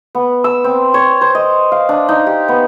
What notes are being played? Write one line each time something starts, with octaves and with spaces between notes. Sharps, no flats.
B3
E6
C4
C#5
C5
D#5
F5
D4
D#4
G4
B3